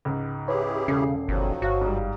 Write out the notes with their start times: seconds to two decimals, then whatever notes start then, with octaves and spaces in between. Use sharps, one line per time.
0.05 C#2 G#2
0.48 E4 G4 G#4 B4 C#5
0.88 E1 C#3 C#4 A4 C7
1.28 G1 D#3 F3 F#3
1.62 G1 F#4 F5
1.81 G#2 G3